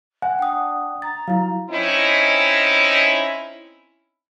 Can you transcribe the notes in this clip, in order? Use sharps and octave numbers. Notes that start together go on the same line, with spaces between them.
F#5 G#5
D4 G5 D#6
A#5 A6
F#3 E4 F5
C4 C#4 D#4 E4